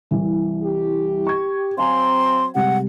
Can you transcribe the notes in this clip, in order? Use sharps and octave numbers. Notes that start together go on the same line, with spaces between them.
C2 E3
G4
C#6 G#6
F#3 C4 F5 G#5 A#5 C6
C3 G3 G#3 F#5